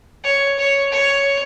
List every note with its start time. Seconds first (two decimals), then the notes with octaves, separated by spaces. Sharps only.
0.24 C#5
0.58 C#5
0.92 C#5